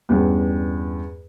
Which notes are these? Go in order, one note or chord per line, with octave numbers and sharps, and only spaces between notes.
E2 G2 G3 C#4